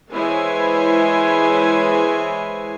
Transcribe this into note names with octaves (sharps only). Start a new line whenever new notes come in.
E3 G#3 E4 C5 C#5 G#5